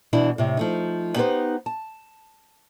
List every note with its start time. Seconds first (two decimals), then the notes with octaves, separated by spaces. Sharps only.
0.13 B2 E3 D4 E4
0.38 A2 C3
0.57 F3 A3 D#4
1.16 B3 D#4 G4 G#4 B4 C5
1.66 A5